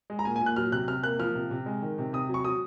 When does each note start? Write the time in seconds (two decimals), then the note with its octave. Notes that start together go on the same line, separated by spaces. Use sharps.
0.10 G#3
0.19 A#5
0.25 A#2 G#5
0.36 G#5
0.41 A#2
0.46 F#6
0.56 F#3 F6
0.72 C3 F#6
0.88 C3 F6
1.03 A#3 F#6
1.19 F3 F6
1.35 C3
1.51 C3
1.66 G#3
1.82 D#3
1.98 C3
2.13 C3 D#6
2.29 F#3
2.34 C#6
2.44 F#3 D#6